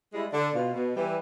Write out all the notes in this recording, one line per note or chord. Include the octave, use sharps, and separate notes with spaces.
G3 G#3 E4
D3 D4
B2 F4
B2
E3 G3